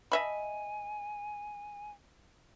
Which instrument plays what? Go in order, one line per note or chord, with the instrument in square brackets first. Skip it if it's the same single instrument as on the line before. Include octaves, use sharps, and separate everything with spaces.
[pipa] D#5 E5 B5 [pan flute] G#5